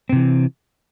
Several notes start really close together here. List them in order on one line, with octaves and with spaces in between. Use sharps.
C4 C3 E3